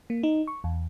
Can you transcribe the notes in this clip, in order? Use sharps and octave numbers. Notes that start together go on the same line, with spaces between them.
A#3
D#4
C#6
E2